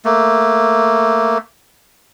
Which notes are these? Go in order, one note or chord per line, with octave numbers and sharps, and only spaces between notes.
A3 A#3